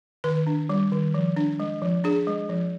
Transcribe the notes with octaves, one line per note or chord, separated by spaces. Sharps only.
D#3 B4
D4
G3
D#3
F3
D4
G#3
F3
D4 G#4
G#3
F3